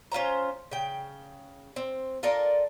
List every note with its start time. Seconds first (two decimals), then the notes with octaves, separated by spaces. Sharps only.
0.12 C#4 F4 C5 A#5
0.71 C#3 G5
1.76 C4
2.23 F4 A4 A#4 D5